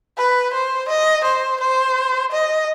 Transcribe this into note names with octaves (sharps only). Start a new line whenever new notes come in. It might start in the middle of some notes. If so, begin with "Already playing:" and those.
B4
C5
D#5
C5
C5
D#5